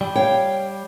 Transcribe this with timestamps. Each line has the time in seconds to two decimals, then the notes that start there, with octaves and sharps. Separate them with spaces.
0.01 G3
0.16 C#5 F5 G5